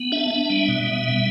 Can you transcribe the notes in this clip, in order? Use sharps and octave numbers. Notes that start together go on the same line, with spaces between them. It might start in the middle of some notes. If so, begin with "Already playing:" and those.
Already playing: B3
D4 E5
B3
G3
B2
B3
G3